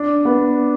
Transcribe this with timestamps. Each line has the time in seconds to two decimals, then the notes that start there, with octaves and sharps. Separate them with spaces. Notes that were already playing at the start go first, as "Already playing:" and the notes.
Already playing: D4
0.25 B3